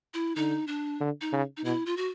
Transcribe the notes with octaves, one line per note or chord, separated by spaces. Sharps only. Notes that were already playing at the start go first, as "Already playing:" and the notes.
E4
D3 D#4
D4
D3
D#4
C#3
D#4
B2 E4
F4
F#4